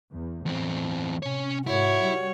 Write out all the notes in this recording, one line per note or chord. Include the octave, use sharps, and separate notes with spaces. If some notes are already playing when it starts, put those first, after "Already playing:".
E2
E2 A2 C4
C3 C#4 C#5
G#2 E4 F#4 C#5
G3